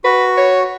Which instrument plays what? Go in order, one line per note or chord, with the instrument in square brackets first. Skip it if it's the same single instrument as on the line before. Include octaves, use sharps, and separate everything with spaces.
[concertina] F#4 [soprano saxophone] B4
[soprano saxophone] C#5